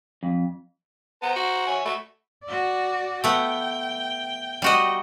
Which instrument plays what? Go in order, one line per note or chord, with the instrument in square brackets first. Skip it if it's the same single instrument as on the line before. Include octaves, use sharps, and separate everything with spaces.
[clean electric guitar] F2
[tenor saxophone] B3 [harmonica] C5 A#5
[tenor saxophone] F#4
[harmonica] C#5 E5 G#5
[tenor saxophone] A3 [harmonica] F#4 B5 C#6
[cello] F#4 D5
[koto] A3 B3 [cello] G5
[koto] G3 F#4 D#5